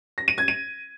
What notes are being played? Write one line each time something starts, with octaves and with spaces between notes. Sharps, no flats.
A#6
D#7
G#6
D#7